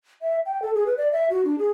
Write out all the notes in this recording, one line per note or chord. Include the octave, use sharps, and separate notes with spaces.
E5
G5
A4
G#4
B4
D5
E5
F#4
D4
G#4